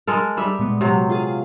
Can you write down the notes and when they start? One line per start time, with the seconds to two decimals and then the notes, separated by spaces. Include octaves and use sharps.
0.07 G#3 A4 A#4
0.37 G3 E5
0.59 A#2 G#3 B3
0.81 C3 F#3
1.10 F4 G#4 F5